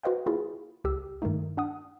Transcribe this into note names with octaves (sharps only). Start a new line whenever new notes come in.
F#4 B4 C5 D#5 F5 G5
A#3 E4 F4 G#4 B4
C#2 G4 E6
G2 D#3 G#3 A3 D#4
D4 F#5 D#6